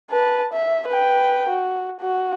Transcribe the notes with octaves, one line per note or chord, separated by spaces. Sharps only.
B4 A5
E5
B4 G5
F#4
F#4